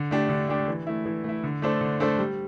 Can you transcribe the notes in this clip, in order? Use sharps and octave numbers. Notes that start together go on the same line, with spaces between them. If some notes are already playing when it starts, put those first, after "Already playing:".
Already playing: D3
A3 D4 G4
D3
A3 D4 G4
E3
A3 E4
E3
A3 E4
D3
A3 D4 A4 C5
D3
A3 D4 A4 C5
G3